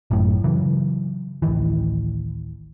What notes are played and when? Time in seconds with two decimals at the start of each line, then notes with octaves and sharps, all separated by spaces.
0.11 G#1 F#2 A2
0.44 C#3 E3 F#3
1.42 D1 A1 D#3 E3